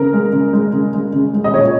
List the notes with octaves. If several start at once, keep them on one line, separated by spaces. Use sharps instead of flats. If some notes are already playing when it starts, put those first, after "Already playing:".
Already playing: C#3 A#4
G#3
C#3
G#3
C#3
G#3
C#3
G#3
D#5
A#2 C#5